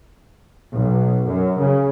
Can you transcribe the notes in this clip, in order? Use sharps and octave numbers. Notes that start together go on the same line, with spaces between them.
B1
F#2
C#3